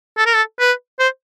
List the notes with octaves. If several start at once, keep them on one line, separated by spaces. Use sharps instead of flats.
A4
A#4
A4
B4
C5